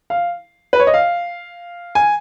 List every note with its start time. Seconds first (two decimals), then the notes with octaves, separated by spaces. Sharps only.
0.10 F5
0.73 B4
0.80 C#5
0.87 D#5
0.94 F5
1.95 G#5